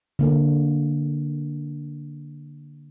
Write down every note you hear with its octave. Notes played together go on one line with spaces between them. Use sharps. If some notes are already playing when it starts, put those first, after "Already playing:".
D3 A#3